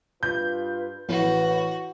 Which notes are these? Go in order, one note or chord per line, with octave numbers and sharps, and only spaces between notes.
G2 F4 B4 G6
A1 F#4 B4